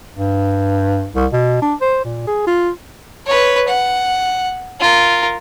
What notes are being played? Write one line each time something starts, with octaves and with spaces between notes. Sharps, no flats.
G2
C2
B2
D4
C5
A#2
G#4
F4
B4 C#5
F#5
F4 A#4